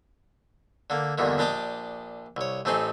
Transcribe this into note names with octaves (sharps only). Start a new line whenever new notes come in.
D3 A#3
E2 G2 A#2 D3 D#3
A#1 D4 G4 D#5 D6
C2 C#5
A1 A3 C4 D#4 G#4 C6